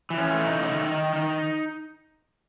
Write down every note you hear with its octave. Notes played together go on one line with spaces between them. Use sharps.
E3
C#4
A3
D#4
C#3
D#3
D#3
D#3